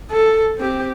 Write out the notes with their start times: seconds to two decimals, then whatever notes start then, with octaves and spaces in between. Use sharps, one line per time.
0.11 A4
0.58 C4 G4